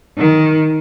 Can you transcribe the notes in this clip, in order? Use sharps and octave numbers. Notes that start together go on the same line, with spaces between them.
D#3